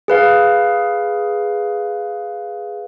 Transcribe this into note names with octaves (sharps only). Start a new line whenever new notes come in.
G#4 B4 F5